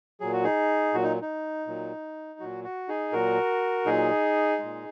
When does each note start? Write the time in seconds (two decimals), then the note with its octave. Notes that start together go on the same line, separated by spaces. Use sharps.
0.20 A#2 F#3 G#4
0.33 F#4
0.44 D#4 G#4
0.94 A#2 F#3 F#4
1.03 D#4
1.22 D#4
1.67 A#2 F#3
2.40 A#2 F#3 F#4
2.64 F#4
2.89 D#4 G#4
3.13 A#2 F#3 F#4 A#4
3.86 A#2 F#3 D#4 G#4
4.59 A#2 G#3